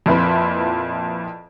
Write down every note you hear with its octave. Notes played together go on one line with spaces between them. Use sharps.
F2 A#2 E4 B4 B5